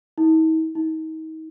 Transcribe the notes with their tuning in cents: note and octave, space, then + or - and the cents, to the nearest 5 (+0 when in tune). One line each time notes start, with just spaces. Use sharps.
D#4 +45
D#4 +35